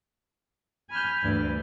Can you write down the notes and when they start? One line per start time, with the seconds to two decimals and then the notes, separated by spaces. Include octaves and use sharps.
0.90 G#5 B5 F6 G6
1.22 D2 G2 E3 D5